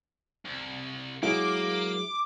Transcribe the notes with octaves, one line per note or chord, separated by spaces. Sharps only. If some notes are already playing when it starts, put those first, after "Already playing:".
C2
F#3 G#3 A#3 E4 D6